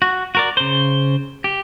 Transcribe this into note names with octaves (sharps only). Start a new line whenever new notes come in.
F#4
F#4 A#4 D5
C#3 C5
G4